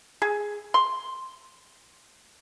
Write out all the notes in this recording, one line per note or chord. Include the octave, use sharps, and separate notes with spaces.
G#4
C6